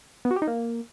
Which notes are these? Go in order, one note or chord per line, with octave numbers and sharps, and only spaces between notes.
B3
F#4
G4
D#4
A#3